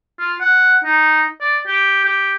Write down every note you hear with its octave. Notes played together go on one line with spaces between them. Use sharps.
F4
F#5
D#4
D5
G4
G4